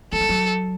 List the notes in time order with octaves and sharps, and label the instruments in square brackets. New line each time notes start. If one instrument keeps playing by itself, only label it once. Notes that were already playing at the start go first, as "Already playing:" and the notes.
[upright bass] F#3 [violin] A4
[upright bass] G3
F#3